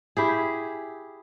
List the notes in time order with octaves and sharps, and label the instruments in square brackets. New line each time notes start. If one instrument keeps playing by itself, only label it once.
[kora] E4 G4 G#4